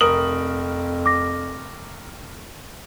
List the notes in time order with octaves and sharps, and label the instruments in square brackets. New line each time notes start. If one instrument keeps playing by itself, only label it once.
[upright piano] F1 A#4 F#7 [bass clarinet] F2 [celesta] D#6
[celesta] D6 A#6